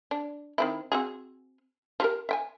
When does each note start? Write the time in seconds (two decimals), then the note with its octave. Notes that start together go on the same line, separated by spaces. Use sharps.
0.11 D4
0.58 D#3 C4 E4
0.92 C4 F#4 G#4
2.00 F3 G4 A#4
2.29 E5 G5 G#5